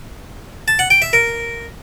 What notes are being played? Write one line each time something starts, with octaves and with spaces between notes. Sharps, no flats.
A5
F#5
G5
E5
A#4